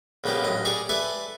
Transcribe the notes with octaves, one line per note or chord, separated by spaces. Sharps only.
A#1 C#3 A#3 B3 G4
A1 F#2 D#5
G4 G#4 D5 C#6
A4 B4 D5 E5 G#5